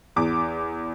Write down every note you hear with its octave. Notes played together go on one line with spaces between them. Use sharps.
E2 D6